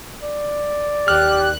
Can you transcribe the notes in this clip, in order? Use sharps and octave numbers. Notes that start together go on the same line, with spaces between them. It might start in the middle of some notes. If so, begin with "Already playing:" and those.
D5
D#2 G4 F6 F#6